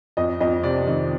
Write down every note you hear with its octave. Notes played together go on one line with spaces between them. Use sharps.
F2 D#5
F2 D#5
C3 D5
D#3 D#5